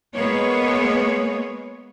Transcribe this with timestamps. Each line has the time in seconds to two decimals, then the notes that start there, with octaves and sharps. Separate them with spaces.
0.15 G#3 A#3 B3 C#5